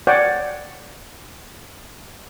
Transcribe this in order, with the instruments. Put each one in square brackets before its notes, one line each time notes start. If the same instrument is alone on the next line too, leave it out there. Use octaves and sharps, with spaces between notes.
[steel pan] C#5 D5 F#5 G5